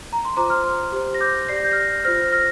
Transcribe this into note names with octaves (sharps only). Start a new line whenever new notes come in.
A#5
C6
F4 C5 A#5 D6
C6 F6
G4 C5
A#6
D6 G6
G4 D5 C7
A#6
G6
F6 A#6
F4 C5 F6 A#6
F6 A#6